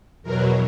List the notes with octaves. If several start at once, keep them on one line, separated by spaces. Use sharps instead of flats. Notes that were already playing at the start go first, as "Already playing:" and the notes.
E2 B2 F#3 A#4